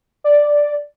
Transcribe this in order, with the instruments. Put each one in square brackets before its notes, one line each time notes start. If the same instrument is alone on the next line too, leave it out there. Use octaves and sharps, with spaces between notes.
[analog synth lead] D5